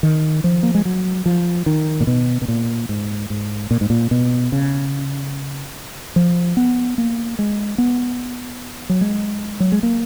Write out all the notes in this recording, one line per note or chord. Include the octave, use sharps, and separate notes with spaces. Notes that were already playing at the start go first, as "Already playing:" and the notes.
D#3
F3
A#3
G#3
F#3
F3
D#3
A#2
B2
B2
A#2
G#2
G#2
A#2
G#2
A#2
B2
C#3
F3
B3
A#3
G#3
B3
F#3
G#3
F#3
G#3
A#3